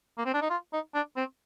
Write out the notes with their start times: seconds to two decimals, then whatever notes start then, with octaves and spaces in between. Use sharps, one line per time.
0.18 A#3
0.26 C4
0.33 D4
0.41 D#4
0.50 F4
0.73 D#4
0.94 D4
1.17 C4